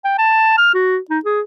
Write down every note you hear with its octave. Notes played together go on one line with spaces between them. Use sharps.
G5
A5
F6
F#4
D#4
G#4